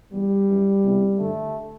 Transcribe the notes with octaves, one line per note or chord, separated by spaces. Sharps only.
E2 B2 G3
F#2 E3
E2 C3 E3
G2 D3 A3